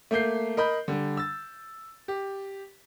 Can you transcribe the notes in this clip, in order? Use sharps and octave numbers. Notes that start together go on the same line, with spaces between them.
A3 A#3 G6 C7
A#4 D#5 B5 G6
D3 G3
E6 A6
G4